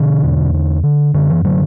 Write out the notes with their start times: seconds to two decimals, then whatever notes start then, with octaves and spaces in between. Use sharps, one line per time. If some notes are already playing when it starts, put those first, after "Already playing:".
Already playing: B2 D3
0.23 E2
0.54 D3
0.84 D3
1.14 F#2 D3
1.30 E3
1.45 D3 F#3